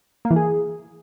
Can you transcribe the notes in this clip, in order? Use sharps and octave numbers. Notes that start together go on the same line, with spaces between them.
A#3
E3
G#4